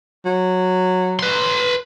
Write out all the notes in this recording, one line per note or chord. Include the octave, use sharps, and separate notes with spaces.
F#3
B4 C6